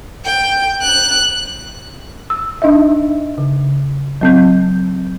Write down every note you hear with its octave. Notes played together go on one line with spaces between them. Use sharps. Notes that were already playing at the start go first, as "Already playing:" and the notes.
G5
F#6
E6
D4 D#4 D#5 E5
C#3
F#3 C4 G6